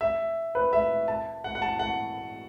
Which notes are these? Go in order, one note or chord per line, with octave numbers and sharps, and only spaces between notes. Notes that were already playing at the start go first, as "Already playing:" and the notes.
E5
B4
E5
A5
F#5
F#5
A5
F#5